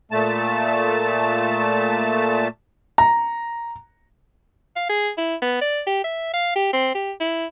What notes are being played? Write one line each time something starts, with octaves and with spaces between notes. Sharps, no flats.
A#2 A3 A5
A#5
F5
G#4
E4
B3
D5
G4
E5
F5
G4
C4
G4
E4